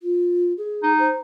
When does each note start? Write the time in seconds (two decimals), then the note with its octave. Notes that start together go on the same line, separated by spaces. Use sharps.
0.02 F4
0.58 G#4
0.83 D#4
0.99 C5